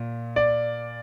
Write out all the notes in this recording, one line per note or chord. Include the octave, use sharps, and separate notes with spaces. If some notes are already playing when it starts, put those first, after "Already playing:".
Already playing: A#2
D5